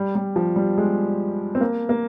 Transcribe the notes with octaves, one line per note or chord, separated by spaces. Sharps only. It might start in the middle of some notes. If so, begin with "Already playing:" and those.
Already playing: G3
G3
F3
G3
G#3
C4
A#3
A#3